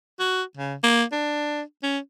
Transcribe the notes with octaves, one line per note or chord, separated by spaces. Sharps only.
F#4
C#3
A#3
D4
C#4